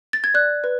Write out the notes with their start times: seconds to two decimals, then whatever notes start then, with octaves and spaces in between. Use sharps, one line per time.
0.13 A6
0.24 G#6
0.34 D5 F#6
0.64 B4